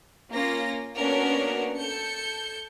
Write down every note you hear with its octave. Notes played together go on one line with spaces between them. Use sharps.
A#3 C#4 F4 A#6
A#3 B3 C#4 D4 F#4 A#4
A4 G6 C#7